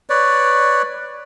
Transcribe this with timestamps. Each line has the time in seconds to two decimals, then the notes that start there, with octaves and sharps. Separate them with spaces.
0.10 B4 C#5 D5